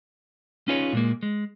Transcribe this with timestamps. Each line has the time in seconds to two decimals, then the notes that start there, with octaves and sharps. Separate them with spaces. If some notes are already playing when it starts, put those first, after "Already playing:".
0.68 C#4 D#4 F4 G#4 B4 C#5
0.93 A#2 G#3 A#3
1.23 G#3